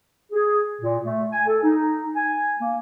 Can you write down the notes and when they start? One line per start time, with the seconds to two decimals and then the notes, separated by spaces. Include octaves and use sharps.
0.32 G#4
0.81 A#2
1.02 A3
1.32 G#5
1.46 A4
1.63 D#4
2.15 G#5
2.60 A#3